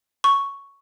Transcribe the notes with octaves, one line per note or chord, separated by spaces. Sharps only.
C#6